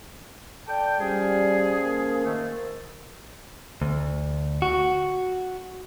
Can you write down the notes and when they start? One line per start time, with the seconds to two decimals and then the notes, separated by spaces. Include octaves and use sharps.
0.67 A4 D5 G5
1.00 F3 G3 C#4 G#4
1.80 A#3
2.25 G#2 D#3 A3
3.82 D2
4.62 F#4